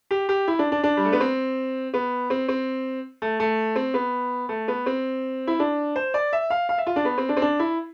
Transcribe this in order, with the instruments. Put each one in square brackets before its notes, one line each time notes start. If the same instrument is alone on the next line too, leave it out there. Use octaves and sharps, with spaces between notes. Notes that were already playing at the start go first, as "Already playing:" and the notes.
[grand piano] G4
G4
E4
D4
D4
D4
G3
A3
B3
C4
B3
C4
C4
A3
A3
C4
B3
A3
B3
C4
E4
D4
C5
D5
E5
F5
F5
E5
F4
D4
B3
C4
D4
C4
D4
E4